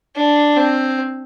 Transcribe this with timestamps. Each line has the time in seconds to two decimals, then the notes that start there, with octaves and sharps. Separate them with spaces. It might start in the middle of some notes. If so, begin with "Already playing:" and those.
0.16 D4
0.57 C4